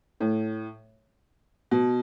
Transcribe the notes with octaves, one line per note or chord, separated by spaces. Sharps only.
A2
B2